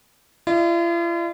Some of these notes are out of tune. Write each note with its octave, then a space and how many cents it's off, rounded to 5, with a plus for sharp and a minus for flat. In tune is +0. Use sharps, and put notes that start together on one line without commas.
F4 -45 D#5 -35